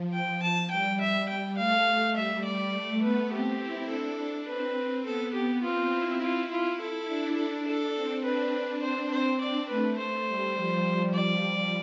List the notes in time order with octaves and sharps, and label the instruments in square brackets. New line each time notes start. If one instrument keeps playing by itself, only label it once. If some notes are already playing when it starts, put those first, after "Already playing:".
Already playing: [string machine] F3
[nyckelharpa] G5
A5
[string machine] G3 [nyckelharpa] G5
[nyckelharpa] E5
G5
[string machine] A3 [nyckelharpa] F5
[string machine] A3
[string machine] G3 [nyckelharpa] E5
[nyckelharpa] D5
[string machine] A3
[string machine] B3 [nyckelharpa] B4
[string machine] C4 [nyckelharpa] G4
[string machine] E4
[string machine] D4 [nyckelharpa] A4
[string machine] C4 [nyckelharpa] B4
[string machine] B3 [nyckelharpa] A4
[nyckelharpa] G4
[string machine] C4 [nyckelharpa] F4
[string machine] E4
[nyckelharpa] F4
[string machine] E4 [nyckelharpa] F4
[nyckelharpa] A4
[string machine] D4
[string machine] D4 [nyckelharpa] A4
[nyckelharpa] A4
[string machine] C4
[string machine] D4 [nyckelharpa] B4
[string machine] C4 [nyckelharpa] C5
[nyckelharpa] C5
[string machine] D4 [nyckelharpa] D5
[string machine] A3 [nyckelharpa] B4
[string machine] A3 [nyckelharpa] C5
[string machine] G3
F3
[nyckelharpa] D5